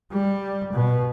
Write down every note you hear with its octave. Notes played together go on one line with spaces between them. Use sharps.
G3
B2